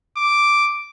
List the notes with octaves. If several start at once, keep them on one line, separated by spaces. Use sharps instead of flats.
D6